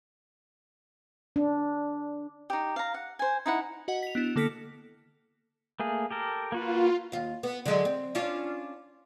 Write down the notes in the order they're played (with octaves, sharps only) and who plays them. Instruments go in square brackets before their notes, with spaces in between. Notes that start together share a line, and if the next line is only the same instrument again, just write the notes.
[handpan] D4
[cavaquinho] D#4 G4
F5 A#5
F#5
C5 G#5
D#4 E4 F#5
[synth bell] F#4 D#5 F#5
B6 F7
B3 D4 E4
D3 A#3 A4 F6 B6 C#7
[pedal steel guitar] A3 A#3 G#4
G4 A4 A#4
[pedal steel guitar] A#3 F#4 B4 [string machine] F4
[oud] D#2 F4
B3
D3 F#3 G#3
C4
C#4 D4 F4